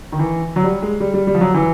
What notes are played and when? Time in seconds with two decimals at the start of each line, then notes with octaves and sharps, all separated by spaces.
0.12 D#3
0.19 E3
0.56 F#3
0.63 G3
0.82 G#3
1.00 G3
1.14 G3
1.27 G3
1.35 F3
1.41 F#3
1.54 E3